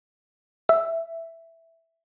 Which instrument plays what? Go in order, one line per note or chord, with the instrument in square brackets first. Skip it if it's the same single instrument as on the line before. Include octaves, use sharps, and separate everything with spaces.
[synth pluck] E5